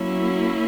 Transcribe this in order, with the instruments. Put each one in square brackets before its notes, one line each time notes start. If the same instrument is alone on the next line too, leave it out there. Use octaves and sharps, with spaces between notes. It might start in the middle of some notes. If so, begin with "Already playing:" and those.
Already playing: [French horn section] F#3 [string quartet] A#3 C#4 E4